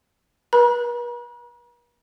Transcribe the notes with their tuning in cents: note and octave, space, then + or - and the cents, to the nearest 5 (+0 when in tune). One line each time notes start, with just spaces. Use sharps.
B4 -45 A#5 +45